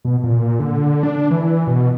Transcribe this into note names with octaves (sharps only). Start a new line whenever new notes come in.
B2
A#2
D3
D4
E3
B2